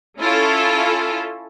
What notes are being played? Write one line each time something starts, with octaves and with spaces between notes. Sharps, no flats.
C#4 E4 F4 A4